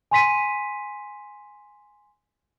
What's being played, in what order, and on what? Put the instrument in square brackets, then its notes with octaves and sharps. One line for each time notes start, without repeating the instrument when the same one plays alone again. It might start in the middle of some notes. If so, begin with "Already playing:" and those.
[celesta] G#5 C6 B6 D#7